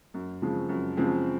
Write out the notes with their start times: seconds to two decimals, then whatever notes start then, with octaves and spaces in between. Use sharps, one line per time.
0.14 F#2
0.42 C#3 F3 G#3 C4
0.69 F#2
0.97 C#3 F3 G#3 C4